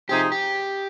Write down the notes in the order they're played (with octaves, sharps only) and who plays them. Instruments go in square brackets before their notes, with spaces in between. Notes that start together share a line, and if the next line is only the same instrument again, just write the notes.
[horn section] C3 F3 C4 D#4 G#4 [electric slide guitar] G4
[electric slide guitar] G4